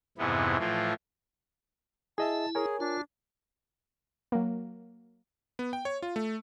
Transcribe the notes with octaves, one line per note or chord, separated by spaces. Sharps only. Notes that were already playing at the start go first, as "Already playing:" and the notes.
F2 G#2 C3 E3 B3
A2 E3 F3 F4
E4 G#4 D#5 E5 A5
G#4 A#4 C#5 G#5
D4 F4
F#3 A#3
B3
G5
C#5
F4
A3